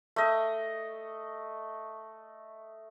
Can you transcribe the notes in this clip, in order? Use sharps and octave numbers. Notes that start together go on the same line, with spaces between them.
A3 D#5